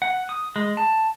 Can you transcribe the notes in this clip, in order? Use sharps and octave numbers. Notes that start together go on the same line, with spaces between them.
F#5
D#6
G#3
A5